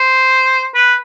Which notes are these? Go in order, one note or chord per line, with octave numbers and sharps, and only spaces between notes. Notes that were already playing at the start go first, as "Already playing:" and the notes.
Already playing: C5
B4